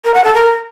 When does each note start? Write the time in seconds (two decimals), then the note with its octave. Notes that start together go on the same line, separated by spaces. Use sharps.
0.04 A#4
0.14 F#5
0.24 A4
0.34 A#4